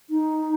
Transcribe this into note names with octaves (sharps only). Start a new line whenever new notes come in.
D#4